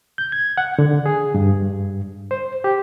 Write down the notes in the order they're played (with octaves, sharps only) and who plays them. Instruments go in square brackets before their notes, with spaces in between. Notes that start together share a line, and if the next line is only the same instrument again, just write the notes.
[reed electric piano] G6
G#6
F#5
D3
G#4
G2
C5
G4